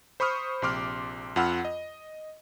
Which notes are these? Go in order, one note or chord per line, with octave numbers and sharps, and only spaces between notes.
C5 B5 C#6 D#6 F6
A#1 C3 C6 D6 F6
F2 F4 F#5 B5 E6 F6
D#5